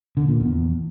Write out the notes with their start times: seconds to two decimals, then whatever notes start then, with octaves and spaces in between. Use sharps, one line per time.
0.17 D3
0.28 A#2
0.40 E2